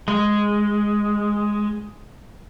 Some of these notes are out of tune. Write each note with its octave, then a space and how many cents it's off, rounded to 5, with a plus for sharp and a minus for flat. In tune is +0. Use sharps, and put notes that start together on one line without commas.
G#3 +0